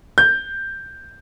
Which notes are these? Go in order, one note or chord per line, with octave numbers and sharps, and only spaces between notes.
G6